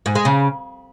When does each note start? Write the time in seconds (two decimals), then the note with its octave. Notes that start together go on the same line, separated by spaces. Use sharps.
0.06 G#2
0.15 G#3
0.25 C#3